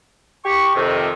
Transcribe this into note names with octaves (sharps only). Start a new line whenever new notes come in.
G4 C#6
F2 C3 D#3